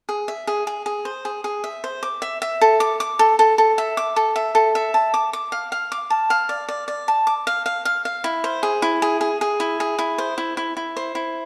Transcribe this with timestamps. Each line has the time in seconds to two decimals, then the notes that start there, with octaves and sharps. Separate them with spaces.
0.09 G#4
0.28 E5
0.47 G#4
0.67 G#4
0.86 G#4
1.05 C5
1.25 G#4
1.44 G#4
1.64 E5
1.84 C5
2.03 D6
2.22 E5
2.42 E5
2.61 A4
2.80 D6
3.00 D6
3.19 A4
3.39 A4
3.58 A4
3.78 E5
3.97 D6
4.16 A4
4.36 E5
4.55 A4
4.75 E5
4.94 A5
5.14 D6
5.33 D6
5.52 F5
5.72 F5
5.92 D6
6.10 A5
6.30 F5
6.49 D5
6.69 D5
6.88 D5
7.08 A5
7.27 D6
7.47 F5
7.66 F5
7.85 F5
8.05 F5
8.24 E4
8.44 C5
8.63 G#4
8.82 E4
9.02 G#4
9.21 G#4
9.41 G#4
9.60 E4
9.80 G#4
9.99 E4
10.18 C5
10.38 E4
10.57 E4
10.77 E4
10.97 C5
11.15 E4